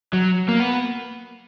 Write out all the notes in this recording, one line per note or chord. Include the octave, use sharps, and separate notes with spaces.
F#3
A#3
B3